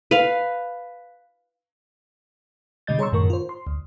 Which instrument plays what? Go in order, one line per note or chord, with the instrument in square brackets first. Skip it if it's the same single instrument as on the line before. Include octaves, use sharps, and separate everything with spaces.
[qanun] B4 F5
[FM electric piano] B2 D3 G3 D#5 G6 A6
G#4 C#5 A#5 C6 C#6 E6
F#2 A2 D#3 A#4 C#6
F4 C5
C6
D2